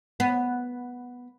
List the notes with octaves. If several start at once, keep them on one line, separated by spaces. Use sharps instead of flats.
B3